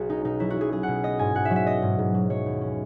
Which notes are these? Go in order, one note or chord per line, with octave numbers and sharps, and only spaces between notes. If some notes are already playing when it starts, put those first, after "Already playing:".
Already playing: B1 F#4 G#4
C#4 D#4
B2 D#4
F#3 E4
F#4
B1 G#4
C#4 G#4
B2 F#5
B3 D#5
G#2 G#5
G#2 F#5
E5
F#3
E5
B3 D#5
G#2
G#2
F#3
F#3 C#5
D#2
C#4